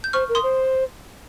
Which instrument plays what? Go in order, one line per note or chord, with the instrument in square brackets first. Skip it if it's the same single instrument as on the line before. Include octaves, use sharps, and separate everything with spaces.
[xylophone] G6
[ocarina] C5 [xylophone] C#6 F6
[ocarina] A#4
[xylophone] C6 D#6
[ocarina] C5